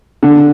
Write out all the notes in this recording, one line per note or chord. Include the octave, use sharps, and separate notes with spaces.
D3